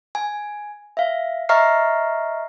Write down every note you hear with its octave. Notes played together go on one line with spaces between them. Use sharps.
G#5
E5 F5
D#5 E5 A#5 C#6 F6 C7